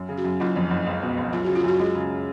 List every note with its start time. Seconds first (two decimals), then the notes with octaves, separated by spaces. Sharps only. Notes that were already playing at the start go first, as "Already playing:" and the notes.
Already playing: F#2
0.09 C#3
0.17 F#4
0.24 F#2
0.40 F#1 F4
0.56 F2
0.70 F#1
0.87 C#2
1.02 B2
1.17 C#2
1.33 F#2 F4
1.45 C#3 F#4
1.55 F4
1.63 F#2 F#4
1.79 G#3 F4
1.95 C#3